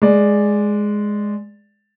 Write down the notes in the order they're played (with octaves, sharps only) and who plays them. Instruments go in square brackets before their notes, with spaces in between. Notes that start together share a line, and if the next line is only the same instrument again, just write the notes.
[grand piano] G#3 D5